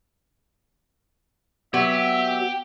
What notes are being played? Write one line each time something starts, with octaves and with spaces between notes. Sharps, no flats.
F#3 B3 G4 E5